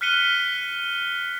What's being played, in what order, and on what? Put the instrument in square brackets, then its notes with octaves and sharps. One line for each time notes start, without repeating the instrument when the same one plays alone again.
[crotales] F6 F#6 B6 C#7 D#7 G7